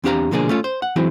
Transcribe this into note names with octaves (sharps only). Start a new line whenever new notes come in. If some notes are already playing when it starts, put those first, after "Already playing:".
E2 C4 D4 G4 F5 A#5
B2 D3 F3 A#3 D4 G#4
A3 C#4 F4
C5
F#5
E3 F#3 G#3 C4 E4